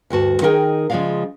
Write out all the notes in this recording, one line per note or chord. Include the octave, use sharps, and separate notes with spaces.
D2 G2 F#4 A5
D#3 D#4 E4 G#4 A#4 G5
C#3 F3 G#3 A#3 D5 F5